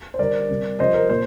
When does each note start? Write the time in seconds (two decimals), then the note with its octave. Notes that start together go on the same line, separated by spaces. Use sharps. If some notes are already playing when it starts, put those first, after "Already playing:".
0.14 C5
0.19 D3 G3 A#4 D5
0.49 C3 G3
0.79 C3 F3 C5 D#5
0.94 A#4
1.09 A#2 C5